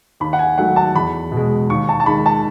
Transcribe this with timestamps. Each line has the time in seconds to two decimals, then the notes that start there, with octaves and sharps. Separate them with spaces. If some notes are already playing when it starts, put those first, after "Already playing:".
0.20 D#2 B5
0.33 F#5
0.39 G#5
0.58 D#3 F#3 A3 F#5
0.76 A5
0.95 E2 B5
1.32 B2
1.37 G#3
1.70 D#2 C#6
1.89 A5
2.00 A5
2.06 D#3 G#3 B5
2.26 A5